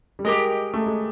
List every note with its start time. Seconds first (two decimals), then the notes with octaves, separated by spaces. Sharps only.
0.19 G3
0.25 G#3 G4 A#4 D#5
0.74 A3
0.86 G#3